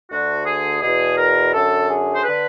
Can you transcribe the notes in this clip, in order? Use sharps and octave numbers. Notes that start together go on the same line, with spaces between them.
D2 D3 F#4
G#4
E2 B2 G#4
A#4
F#2 D3 A4
G#4
C5
D3 B4